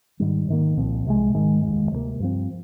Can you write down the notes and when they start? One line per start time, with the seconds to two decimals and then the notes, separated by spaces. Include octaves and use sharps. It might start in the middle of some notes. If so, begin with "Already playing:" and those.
0.20 G#2 D#3 G3
0.48 G#2 D#3 A#3
0.77 C2 A#2 F3 C4
1.06 C2 C3 D#3 G#3
1.34 G#1 G#2 D#3 G#3
1.62 F1 D#2 D#3 G#3
1.91 D2 C3 F3 A#3
2.20 G2 F3 C4